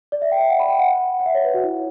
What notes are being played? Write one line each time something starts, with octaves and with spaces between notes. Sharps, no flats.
D5
E5
G5
E5
F#5
B5
G5
F#5
F#5
E5
C#5
B4
F#4
E4